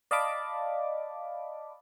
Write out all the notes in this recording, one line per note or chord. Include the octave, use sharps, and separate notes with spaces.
D5 D#5 F5 A5 B5 D6